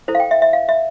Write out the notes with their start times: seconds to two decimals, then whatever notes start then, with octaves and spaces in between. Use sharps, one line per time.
0.08 E4 A4 C5
0.15 F5
0.20 G5
0.31 E5
0.42 E5
0.53 F5
0.69 E5